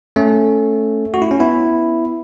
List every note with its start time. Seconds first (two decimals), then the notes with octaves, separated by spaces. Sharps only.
0.16 A3 C#4
1.14 F#4
1.22 E4
1.31 C#4
1.40 B3 E4